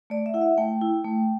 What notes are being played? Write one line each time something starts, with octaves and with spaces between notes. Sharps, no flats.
A3 D5
E5
E4 F#5
E5
A3 G5
E4
A3